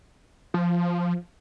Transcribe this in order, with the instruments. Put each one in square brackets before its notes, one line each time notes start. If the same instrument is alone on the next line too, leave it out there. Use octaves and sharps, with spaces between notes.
[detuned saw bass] F3